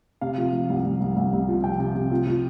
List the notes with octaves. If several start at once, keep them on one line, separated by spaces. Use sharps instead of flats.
C3 F5
F3
F3
C2
C2
C2
C2
C2
F3
C3 G5
C3
C3
F3
F3